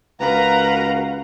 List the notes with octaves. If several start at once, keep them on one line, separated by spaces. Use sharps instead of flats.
C#2 F#4 A#4 B4 F5 F#5 A#5